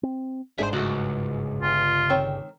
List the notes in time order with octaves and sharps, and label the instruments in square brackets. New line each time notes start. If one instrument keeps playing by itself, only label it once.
[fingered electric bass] C4
[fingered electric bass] G1 G#2 [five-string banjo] D4 G#4 [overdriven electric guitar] C5 E5
[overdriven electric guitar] C#2 [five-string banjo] A3 F#4
[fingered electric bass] G1 [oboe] F4
[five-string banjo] D#3 C4 C#5